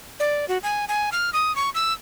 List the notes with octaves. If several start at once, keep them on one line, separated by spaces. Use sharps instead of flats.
D5
F#4
G#5
G#5
F6
D#6
C#6
E6